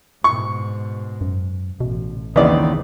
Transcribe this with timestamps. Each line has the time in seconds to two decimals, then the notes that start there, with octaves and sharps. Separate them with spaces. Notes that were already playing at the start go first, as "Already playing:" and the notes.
0.24 G#2 B2 C#6
1.21 F#2
1.80 A1 B2
2.36 D#2 C#3 E3 B3 C4 D#4 E4 D5